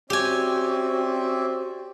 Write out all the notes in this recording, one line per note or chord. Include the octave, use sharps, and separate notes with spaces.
C4 C#4 F#4 G4 D5 E5 G#5